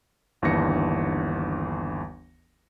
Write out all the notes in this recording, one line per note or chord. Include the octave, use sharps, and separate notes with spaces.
G1 D#2 E3 D4 A#6 C#7